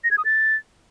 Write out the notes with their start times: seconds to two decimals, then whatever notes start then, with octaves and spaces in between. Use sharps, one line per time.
0.04 A#6
0.11 G#6
0.18 D#6
0.25 A6